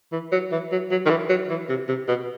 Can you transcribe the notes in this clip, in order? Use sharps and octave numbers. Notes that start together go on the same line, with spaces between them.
E3
F#3
E3
F#3
F#3
D#3
E3
F#3
E3
C3
C3
B2